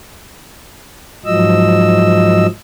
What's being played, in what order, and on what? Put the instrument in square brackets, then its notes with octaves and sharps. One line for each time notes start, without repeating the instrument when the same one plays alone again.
[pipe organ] G#2 F3 F#3 D#5 E6